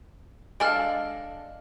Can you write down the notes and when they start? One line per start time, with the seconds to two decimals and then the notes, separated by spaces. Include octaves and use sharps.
0.60 G#3 D4 A4 F5 F6 D7